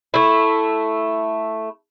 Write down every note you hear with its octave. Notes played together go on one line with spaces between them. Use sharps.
A3 E4